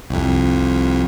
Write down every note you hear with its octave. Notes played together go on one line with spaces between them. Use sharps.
C2 F2